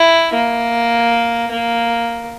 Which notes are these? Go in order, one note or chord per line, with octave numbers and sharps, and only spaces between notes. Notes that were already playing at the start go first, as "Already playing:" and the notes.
Already playing: E4
A#3
A#3